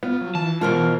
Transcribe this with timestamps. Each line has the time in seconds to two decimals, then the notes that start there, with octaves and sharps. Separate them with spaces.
0.03 B3 F4
0.21 F#3
0.35 E3 A5
0.61 D#2 B2 F4 A#4 C5